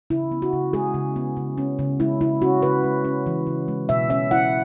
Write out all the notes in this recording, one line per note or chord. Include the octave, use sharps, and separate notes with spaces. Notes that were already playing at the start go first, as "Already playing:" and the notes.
C#3 E4
B3
F#4
C#3
G#3 G#4
C#3
B3
C#3
C#4
C#3
G#3 E4
C#3 E4
C#4 F#4
C#3 B4
G#3
C#4
E3
C#3
G#3
B2 E5
C#4 E5
E4 F#5